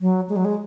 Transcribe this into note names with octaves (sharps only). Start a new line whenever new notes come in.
F#3
G#3
F#3
G#3